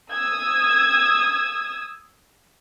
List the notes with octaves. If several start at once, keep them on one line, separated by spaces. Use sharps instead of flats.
D#6 E6 G#6